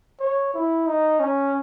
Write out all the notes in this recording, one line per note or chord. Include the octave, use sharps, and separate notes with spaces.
C#5
E4
D#4
C#4